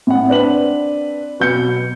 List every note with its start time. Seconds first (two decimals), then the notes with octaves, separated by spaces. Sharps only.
0.07 A2 F#5
0.28 C4 D4 B4 F#7
1.40 B2 F#3 G6 C#7